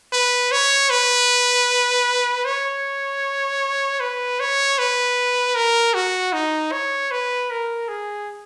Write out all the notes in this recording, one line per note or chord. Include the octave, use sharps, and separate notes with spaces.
B4
C#5
B4
C#5
B4
C#5
B4
A#4
F#4
D#4
C#5
B4
A#4
G#4